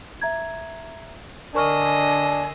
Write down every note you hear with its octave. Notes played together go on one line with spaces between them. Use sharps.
E5 A#5 G#6
D3 D4 A#4 D#5 G#5 C#6 E6 F6